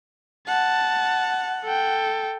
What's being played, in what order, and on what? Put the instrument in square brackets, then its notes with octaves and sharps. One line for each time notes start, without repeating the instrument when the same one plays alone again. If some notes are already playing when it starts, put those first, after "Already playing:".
[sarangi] F#5 [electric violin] A5
[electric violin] A4 G5